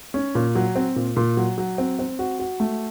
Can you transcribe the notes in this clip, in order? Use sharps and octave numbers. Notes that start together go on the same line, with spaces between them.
C#4
A#2
F#3
C4
A#2
A#2
F#3
F#3
C4
C4
F#4
F#4
A3